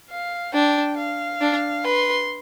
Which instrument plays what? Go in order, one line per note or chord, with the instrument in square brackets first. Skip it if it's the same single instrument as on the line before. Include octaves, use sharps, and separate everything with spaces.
[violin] F5
[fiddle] D4 [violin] G5
[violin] F5
[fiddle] D4
[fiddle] B4 [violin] C6